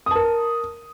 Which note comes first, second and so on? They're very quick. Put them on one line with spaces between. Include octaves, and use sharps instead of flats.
D#6 A5 A#4